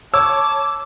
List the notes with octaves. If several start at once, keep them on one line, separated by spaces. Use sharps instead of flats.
C#5 A5 D6 E6